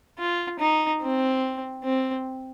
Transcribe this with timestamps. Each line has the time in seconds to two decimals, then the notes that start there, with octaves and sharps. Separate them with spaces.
0.19 F4
0.60 D#4
1.02 C4
1.84 C4